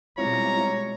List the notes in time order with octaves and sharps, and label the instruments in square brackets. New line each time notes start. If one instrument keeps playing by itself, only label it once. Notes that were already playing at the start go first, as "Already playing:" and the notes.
[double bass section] B2 G3 G#3 [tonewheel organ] C4 E4 F4 [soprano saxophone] C#5 [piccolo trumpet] A#5